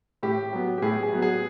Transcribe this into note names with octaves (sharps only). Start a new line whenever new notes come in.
A2 G4
F#3 B3
G4
A2 G#4
G#4
F#3 B3
G#4